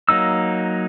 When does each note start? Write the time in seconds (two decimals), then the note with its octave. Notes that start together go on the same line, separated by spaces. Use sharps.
0.09 F#3 A#3 D#4 E6